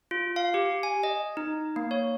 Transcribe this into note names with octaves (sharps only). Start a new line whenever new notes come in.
F4
F5
G4
G#5
D#5
D#4
A#3
C#5